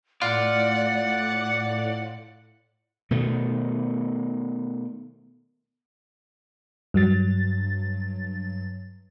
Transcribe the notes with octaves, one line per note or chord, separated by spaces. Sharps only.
A2 F4 D5 F#5
B2 D#3 A3
G2 F#3 A6